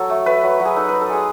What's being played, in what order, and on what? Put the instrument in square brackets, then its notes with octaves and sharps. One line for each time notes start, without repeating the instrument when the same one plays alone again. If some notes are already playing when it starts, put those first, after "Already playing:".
Already playing: [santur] F#3 A4
A3
A3 B4
F#3
F#3
G#4
D#4 A4
D#4 B4
A4
G#3 G#4